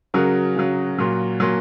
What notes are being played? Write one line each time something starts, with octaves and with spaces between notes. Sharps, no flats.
C#3 F#3 F#4 A#4
C#3 F#3
A#2 F#3
A#2 F#3